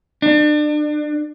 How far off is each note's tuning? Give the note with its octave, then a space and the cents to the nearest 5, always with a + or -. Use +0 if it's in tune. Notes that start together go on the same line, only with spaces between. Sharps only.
D4 +30